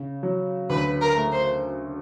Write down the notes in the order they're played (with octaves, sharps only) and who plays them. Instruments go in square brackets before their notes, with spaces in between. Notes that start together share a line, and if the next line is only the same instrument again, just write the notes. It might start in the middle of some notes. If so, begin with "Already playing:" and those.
Already playing: [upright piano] C#3
F#3
[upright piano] D2 [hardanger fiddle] B4
[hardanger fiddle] A#4
[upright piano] A3
[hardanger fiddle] C5